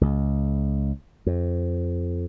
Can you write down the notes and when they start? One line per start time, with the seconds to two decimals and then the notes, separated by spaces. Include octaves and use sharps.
0.01 C#2
1.26 F2